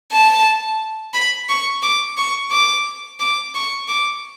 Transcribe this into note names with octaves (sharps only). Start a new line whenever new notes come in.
A5
B5
C#6
D6
C#6
D6
D6
C#6
D6